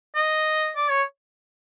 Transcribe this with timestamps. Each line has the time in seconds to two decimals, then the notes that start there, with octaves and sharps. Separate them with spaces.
0.15 D#5
0.76 D5
0.90 C#5